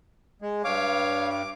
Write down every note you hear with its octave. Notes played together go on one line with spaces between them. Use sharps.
G#3
G2 C#5 F5 D6
D6